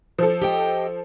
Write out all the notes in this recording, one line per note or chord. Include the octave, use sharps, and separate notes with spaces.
F3 A4
G4 D#5 G5